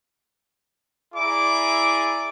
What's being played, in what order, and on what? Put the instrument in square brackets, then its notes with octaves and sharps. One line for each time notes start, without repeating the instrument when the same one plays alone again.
[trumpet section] E4 G#4 D5 A#5 D6